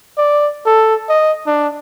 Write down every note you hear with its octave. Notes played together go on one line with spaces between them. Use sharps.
D5
A4
D#5
D4